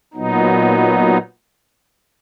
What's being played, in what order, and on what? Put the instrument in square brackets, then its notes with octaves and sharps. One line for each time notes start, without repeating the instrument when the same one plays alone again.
[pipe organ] A#2 F#3 B3 D#4